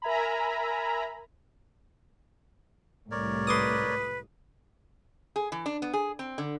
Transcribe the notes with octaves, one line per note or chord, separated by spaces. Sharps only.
A#4 E5 G#5 A#5 B5
C2 A2 A#4 C#5 D5
B4 C6 D6 D#6
G#4
E3
D4
B3
G#4
C4
D3